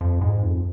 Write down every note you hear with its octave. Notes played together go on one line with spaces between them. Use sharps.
F2
G#2
F2